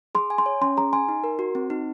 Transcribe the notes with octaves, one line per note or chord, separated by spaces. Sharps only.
G#4 C6
G#5
C6
C#5
C#4 C6
G#4 A#5
G#5 C6
D#4
A#4
F#4
C4
D#4